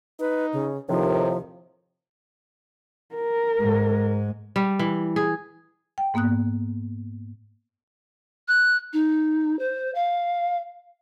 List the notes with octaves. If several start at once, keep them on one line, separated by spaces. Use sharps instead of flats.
D#4 B4
C#3
D#2 A2 C3 D#3 F3
A#4
G#2 G#3
G3
E3
G#4
G5
G#2 A#3 B3 D#6 F#6
F#6
D#4
C5
F5